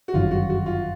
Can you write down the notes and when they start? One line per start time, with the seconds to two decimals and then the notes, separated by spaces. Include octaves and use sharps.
0.08 F#4
0.14 G1 F#2 D#3 F#3 F4
0.31 F#4
0.50 F#4
0.66 F4